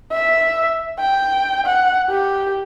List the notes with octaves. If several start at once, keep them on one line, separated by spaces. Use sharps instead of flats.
E5
G5
F#5
G4